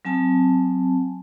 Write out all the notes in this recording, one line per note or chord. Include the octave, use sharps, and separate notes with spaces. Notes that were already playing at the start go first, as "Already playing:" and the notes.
F#3 C4 G#5 A5